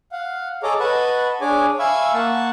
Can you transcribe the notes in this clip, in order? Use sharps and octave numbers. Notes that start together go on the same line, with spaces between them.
F5 F#5
G#4 A4 C#5 D#5 A#5 D6
B4 D#5 F#5 A5 B5 C#6
D4 G#4 C#5 G#5 D6
E5 F5 G#5 B5 C#6 E6
A#3 F#5 A5 C#6